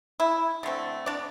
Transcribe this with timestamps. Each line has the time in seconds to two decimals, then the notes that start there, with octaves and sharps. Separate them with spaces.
0.20 E4
0.63 D3 A3 C4
1.06 D4 D5